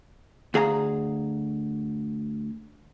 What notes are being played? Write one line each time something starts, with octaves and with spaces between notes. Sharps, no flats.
D2 G#4 F5 A#5